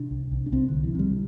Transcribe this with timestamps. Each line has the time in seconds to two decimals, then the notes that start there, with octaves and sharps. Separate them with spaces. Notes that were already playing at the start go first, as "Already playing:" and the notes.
Already playing: C3 D4
0.11 C2
0.31 C2
0.46 D4
0.52 C2 C4
0.69 C2 D3
0.84 E3
0.95 C3 G3